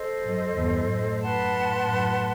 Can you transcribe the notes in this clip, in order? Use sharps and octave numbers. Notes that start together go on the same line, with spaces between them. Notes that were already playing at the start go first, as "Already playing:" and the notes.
Already playing: A4 C5 D#5
F#2
E2 G2
F#2 A2
B4 F#5 A5 C6
F#2 A2